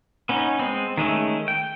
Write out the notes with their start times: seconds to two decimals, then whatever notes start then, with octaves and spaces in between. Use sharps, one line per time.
0.29 B3 C#4 D#4
0.59 G#3 C4
0.97 D#3 G#3 A3 C#4
1.48 G5